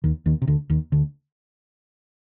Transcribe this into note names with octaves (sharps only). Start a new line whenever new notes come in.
D#2 D#3
D#2 D#3
C3
D2 D3
D#2 D#3
D2 D3